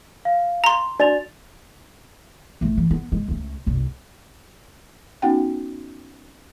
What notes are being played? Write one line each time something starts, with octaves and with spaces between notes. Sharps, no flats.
F5
A#5 C6
D4 F#4 D5 A6 F7
A1 A3
E3
B3
G#3
C#2 A3
F#1 C2
B3 C#4 D#4 F#4 F#5 G5